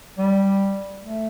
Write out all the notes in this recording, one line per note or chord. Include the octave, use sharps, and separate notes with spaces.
G3
A3